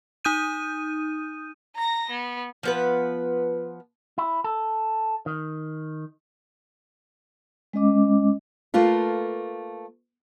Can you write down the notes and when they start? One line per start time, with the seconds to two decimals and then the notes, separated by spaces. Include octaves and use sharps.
0.25 D#4 D#6 G6 D#7
1.76 A#5 A#6
2.11 B3
2.63 F3 B3 B4
4.18 E4
4.44 A4
5.26 D#3
7.73 G#3 C#4 D#5 D6
8.74 A3 A#3 F4 B4